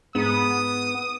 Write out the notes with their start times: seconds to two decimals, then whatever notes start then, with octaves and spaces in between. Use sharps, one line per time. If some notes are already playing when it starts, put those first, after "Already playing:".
0.15 G#2 B3 D#6